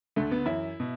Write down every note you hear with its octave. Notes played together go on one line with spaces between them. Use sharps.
D2 D3 A3
B3
F#2 E3 E4
B2